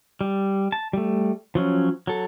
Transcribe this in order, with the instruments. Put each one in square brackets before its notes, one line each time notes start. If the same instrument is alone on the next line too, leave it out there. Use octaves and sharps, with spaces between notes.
[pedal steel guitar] G3
A5
G3 A3
F3 F#3 C#4
F#3 A4